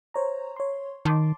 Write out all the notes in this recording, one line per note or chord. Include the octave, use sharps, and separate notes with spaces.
C5 C#5 A#5
C#5 C6
D#3 A5 C6 D6